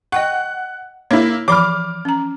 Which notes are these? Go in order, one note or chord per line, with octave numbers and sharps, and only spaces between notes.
D#5 F#5 G5 C#6
A#3 E4 C#5
E3 F3 B5 D6 F6
C#4 A#5